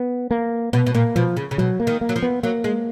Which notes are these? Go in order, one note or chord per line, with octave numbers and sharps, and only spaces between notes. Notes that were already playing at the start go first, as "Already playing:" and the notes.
Already playing: B3
A#3
B2 B3
B2
A#2 A#3
B2 F3
C#3
C#3
B2 F#3
A#3
D#3
A#3
F#3
F3
B3
F#3 A#3
G#3